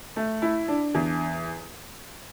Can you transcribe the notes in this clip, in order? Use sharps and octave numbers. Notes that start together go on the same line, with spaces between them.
A3
E4
D4
E2